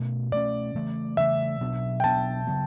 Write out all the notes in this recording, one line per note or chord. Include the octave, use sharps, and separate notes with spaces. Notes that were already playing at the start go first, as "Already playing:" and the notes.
Already playing: B2 A3 C#4
B2 A3 C#4 D5
C#3 E3 A3
C#3 E3 A3 E5
B2 F#3 B3 D4
G5
B2 F#3 B3 D4 A5
C#3 F#3 B3